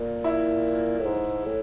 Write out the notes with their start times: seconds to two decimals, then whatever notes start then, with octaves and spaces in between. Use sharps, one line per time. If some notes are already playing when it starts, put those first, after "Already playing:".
Already playing: A#2
0.24 E4
0.99 A2
1.05 G#2
1.45 A2